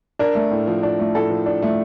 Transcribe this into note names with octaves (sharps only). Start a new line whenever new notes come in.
D4 A#4
A3
A2
F3
D4
A3
A2 A4
F3
D4
A3